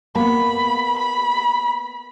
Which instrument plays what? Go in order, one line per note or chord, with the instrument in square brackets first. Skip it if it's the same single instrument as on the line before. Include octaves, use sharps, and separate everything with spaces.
[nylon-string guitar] A#3 B3 [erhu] B5
[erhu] B5